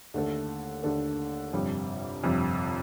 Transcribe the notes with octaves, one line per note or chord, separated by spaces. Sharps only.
D#2 D3 A3 D4 A4
D#2 D3 A3 D4 A4
G1 F2 C3 G3
G1 F2 C3 G3